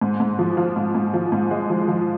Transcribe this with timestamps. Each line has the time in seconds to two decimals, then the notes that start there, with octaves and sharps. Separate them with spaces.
0.01 G#2
0.20 G#2
0.39 F3
0.57 F3
0.76 G#2
0.95 G#2
1.14 F3
1.32 G#2
1.51 G#3
1.70 F3
1.88 F3